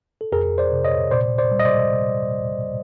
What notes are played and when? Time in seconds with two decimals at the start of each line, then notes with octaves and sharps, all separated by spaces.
0.21 A4
0.32 F2 G#4 A#4
0.58 C5 D5
0.72 C3
0.85 C#5 D#5
1.11 A#2 C5 D5
1.38 C5 D5
1.52 G3
1.59 D#5
1.65 C5 D5